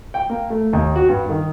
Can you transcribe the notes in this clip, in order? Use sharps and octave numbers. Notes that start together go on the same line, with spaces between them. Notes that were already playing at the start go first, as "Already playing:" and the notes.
G5
A#3
A3
D#2
F#4
G2
D#3